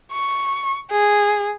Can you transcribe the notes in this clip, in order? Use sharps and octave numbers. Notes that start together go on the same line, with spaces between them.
C#6
G#4